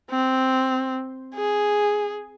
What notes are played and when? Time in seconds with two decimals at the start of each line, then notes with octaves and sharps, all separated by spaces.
0.10 C4
1.35 G#4